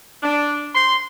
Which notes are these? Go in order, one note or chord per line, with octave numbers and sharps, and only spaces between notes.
D4
C6